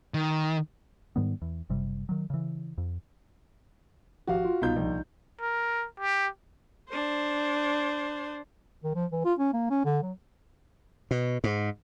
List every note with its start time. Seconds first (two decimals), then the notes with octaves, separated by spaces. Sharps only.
0.14 D#3
1.16 G#2 D#3 G3 B3
1.42 E2
1.70 F#1 C3 G3
2.09 D#3 F#3
2.30 C#3 E3
2.78 F2
4.27 G#1 F3 F#4 G4 F5
4.45 F4
4.62 C2 B2 D#4 F4 G6
4.76 A#1
5.41 A#4
6.00 G4
6.90 D4 C5
8.84 D#3
8.95 F3
9.12 E3
9.25 F4
9.39 C#4
9.54 A#3
9.70 C#4
9.85 D3
10.02 F#3
11.11 B2
11.44 G#2